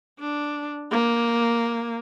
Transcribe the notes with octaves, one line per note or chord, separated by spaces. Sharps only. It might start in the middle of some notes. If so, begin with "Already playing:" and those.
D4
A#3